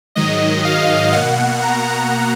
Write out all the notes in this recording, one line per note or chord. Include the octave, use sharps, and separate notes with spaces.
G#2 D#3 F#3 D#5
F5
B2 A#3 F#5
A#5